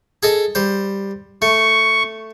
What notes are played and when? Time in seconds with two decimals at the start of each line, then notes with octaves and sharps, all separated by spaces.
0.23 G#4 A4 D#5
0.55 G3 C5
1.42 A3 C#6